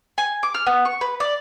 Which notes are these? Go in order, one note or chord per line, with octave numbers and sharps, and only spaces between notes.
G#5
D6
F6
B3
C#6
B4
D5